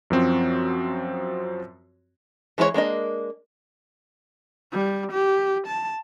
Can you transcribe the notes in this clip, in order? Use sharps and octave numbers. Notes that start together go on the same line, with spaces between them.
F#2 F3 C4 F#4
E3 G#3 E4 F4 C#5
G#3 A#3 D4 D#5
G3
G4
A5